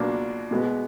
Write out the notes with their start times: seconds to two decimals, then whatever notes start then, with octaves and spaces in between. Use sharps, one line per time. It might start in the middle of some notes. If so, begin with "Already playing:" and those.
Already playing: C#2 B2 F#3 A#3 D4
0.51 B2 G#3 B3